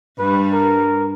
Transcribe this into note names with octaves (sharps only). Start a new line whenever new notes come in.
G2 G3 B4
A#4